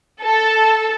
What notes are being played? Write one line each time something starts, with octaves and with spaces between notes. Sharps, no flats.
A4